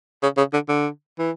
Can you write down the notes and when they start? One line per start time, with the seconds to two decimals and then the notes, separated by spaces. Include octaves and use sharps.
0.23 C#3
0.38 C#3
0.54 D3
0.69 D3
1.19 E3